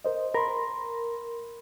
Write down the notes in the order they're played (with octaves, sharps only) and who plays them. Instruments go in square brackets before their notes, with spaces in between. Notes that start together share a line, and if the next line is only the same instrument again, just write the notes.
[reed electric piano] A#4 C5 D#5
[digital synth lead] A#4 [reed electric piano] B5 C6